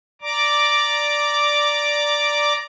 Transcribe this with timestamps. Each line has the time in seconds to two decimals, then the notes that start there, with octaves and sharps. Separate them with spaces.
0.21 D5 A#5 D6